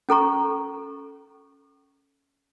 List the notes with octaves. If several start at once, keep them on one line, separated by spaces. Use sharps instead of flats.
C#4 A4 A#5 C#6